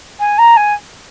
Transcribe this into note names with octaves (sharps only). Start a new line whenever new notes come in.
G#5
A#5
G#5